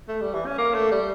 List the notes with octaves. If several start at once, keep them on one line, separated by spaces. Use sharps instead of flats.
A3
G3
E3
C#4
A#3
A3
G3